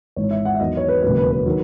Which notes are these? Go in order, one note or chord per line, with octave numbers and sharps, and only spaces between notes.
G#1 G#2 E3 C#5
E5
F#5
E5
E2 D#3 F#3 D#5
C#5
B4
E1 D#2 C#3 F#3 B4
B4
B4
D#3 F#3